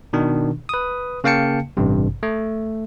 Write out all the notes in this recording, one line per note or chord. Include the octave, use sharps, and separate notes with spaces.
B2 D#3 D4
B4 D#6
C#3 A#3 F5 G5 A5 C#7
A1 G2 C3
A3